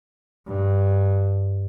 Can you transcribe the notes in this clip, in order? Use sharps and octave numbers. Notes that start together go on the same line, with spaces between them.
G2